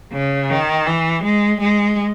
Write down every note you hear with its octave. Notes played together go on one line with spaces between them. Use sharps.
C#3
D#3
E3
G#3
G#3